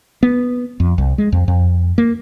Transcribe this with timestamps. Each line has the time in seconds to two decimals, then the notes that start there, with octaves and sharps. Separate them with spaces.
0.23 B3
0.80 F2
0.98 C2
1.18 G#3
1.32 F2
1.48 F2
1.98 A#3